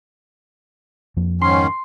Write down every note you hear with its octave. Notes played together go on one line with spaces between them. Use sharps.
F2 F3 A#3
G#2 D#3 C#4 C6